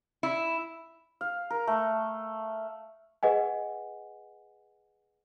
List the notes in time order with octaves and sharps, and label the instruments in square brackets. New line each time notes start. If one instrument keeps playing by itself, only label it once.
[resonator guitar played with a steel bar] E4
[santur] F5
A#4
A3
[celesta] G#4 B4 D#5 F#5 G#5